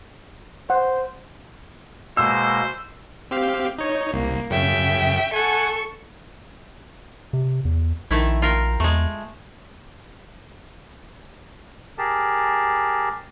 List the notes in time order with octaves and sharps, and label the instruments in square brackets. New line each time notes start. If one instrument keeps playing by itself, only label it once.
[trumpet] C5 [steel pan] F#5
[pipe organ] B2 G#3 A#3 [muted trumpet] C5 [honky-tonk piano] E6
[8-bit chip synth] C4 G4 F5
D#4 C#5
[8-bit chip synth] C2 [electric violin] A#3
[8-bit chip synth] F#2 C#3 [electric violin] E5 G5
[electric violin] A4 C#6 [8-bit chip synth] F#5 G#5
[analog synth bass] C3
E2
[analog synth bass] A#1 [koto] D#3 A3 E4
[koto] F4 A#4 G5
[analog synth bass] E2 [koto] G#3 A3
[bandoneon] G4 G#4 A#4 A5